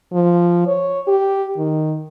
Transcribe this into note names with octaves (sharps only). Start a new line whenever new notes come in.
F3
C#5
G4
D#3